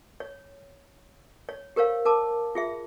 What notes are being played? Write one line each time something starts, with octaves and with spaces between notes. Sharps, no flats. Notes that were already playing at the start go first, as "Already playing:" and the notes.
C#5
C#5
G4 A#4 C5 C#5 F5
A#4 A5 D6
F4 G#4 E5